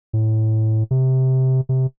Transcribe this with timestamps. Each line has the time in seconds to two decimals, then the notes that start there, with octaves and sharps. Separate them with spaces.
0.13 A2
0.91 C3
1.69 C3